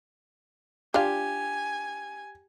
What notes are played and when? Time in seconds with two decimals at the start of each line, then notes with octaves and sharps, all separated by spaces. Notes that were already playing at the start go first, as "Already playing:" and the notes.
0.94 D4 F4 G4 F5 G#5